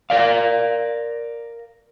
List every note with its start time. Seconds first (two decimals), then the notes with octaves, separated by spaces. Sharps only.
0.10 A#4 D5 F5